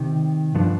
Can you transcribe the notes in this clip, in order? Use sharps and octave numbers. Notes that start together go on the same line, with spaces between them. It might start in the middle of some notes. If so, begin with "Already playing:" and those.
Already playing: C3 D#3
G2 D3 F3